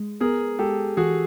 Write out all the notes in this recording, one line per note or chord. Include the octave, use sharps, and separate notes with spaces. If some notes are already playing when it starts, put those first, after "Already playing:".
Already playing: G#3
B3 G#4 A#4
G#3 G4 A4
E3 F#4 G#4